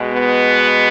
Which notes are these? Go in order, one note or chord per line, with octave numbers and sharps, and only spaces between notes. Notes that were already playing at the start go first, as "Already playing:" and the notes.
Already playing: B2 G#3
B3